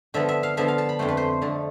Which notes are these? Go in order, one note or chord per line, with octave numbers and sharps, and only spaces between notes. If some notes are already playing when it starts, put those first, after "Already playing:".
D3 F3 B3 E5
E5
F5
D3 F3 B3 E5
F5
A5
B5
F2 D3 A3 C5
B4
C5
F2 D3 A3